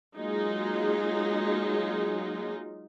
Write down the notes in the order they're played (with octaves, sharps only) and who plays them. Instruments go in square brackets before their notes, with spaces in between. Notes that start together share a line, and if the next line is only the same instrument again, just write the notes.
[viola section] F#3 G#3 A#3 D#4 F4 G#4